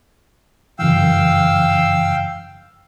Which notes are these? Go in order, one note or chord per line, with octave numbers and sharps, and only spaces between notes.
F#2 C#3 E3 F5 G5 E6